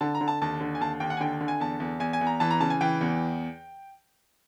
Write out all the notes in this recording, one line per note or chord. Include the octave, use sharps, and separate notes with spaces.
D3 A5
A#5
D3
A5
D#2 A5
D3
G#5
D#2 A5
D#2 G5
F#5
G#5
D3 G5
D3
G#5
E2 A5
E2
E2 G#5
G#5
E2
A#5
E3 A5
A#5
C#3 A5
G#5
E3 G5
E2